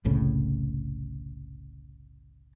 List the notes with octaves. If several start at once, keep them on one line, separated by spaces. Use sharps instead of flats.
F#1 C2 A2 C#3